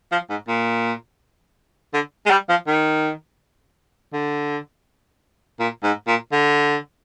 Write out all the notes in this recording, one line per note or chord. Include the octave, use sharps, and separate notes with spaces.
F3
G#2
A#2
D3
G#3
G3
F3
D#3
D3
A#2
G#2
A#2
D3